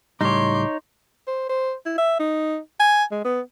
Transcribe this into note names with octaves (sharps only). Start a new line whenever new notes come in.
C#2 A2 G3 D#4 C#5 C6 D6
C5
C5
E4
E5
D#4
G#5
G#3
B3